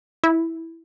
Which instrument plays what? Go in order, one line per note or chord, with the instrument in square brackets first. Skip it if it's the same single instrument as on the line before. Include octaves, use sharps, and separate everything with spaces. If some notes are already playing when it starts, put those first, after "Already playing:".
[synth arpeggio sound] E4